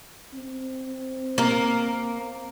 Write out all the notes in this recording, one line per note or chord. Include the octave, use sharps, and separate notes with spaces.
C4
A#3 A#4